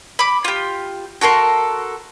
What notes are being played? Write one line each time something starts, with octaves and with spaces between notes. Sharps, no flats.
B5 D6
F4 G4
F#4 A4 A#4 C6